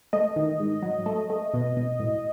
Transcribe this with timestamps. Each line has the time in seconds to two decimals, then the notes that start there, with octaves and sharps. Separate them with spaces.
0.13 A3 D#5
0.36 D#3
0.60 G#2
0.83 F#3
1.06 A3
1.30 A3
1.54 B2
1.77 B2
2.00 A2